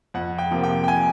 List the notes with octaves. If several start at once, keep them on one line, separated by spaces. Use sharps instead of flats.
F2 F#5
G5
C3 F3 A#3
G5
G5
G#5